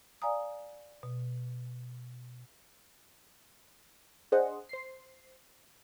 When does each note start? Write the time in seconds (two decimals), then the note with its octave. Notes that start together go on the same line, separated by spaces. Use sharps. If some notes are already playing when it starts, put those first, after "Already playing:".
0.22 D5 F5 G#5 A#5 D#6
1.03 B2
4.32 D4 G#4 C5 D#5 F#5
4.69 C5 C7